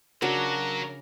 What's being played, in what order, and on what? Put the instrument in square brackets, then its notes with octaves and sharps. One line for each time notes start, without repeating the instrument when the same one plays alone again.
[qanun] C#3 D4 F#4 [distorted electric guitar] F#3 [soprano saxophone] A#4